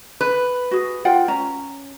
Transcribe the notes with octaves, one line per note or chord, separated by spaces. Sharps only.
B4
F#4 G#4
F4 F#5 G5
C#4 A#5